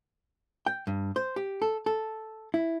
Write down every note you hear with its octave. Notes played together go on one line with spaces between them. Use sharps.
G5
G2
C5
G4
A4
A4
E4